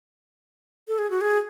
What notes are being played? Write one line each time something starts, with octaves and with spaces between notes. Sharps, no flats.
A4
G#4
F#4
G#4